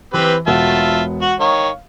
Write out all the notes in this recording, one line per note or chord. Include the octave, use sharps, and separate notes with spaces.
E3 C4 G4 B4
E1 B2 F4 E5 F#5 A5
F#4 F#5
D#3 C#5 F5